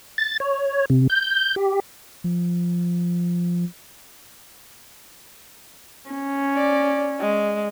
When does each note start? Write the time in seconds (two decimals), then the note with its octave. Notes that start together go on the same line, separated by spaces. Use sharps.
0.18 A6
0.40 C#5
0.90 C3
1.10 G6
1.56 G4
2.24 F3
6.10 C#4
6.56 D5
7.20 G#3